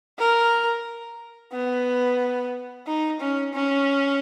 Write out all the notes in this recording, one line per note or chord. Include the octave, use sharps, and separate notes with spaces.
A#4
B3
D#4
C#4
C#4